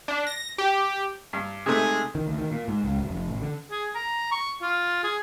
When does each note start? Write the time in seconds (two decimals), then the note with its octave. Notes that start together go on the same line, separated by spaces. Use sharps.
0.08 D4
0.27 A#6
0.58 G4
1.33 G2
1.66 C3 G#3 A3 D#4 G#4
2.15 D#3
2.27 D2
2.38 D#3
2.51 A#2
2.68 G#2
2.84 C#2
2.97 D1
3.09 F1
3.28 A1
3.42 D3
3.71 G#4
3.95 A#5
4.32 C#6
4.62 F4
5.04 G#4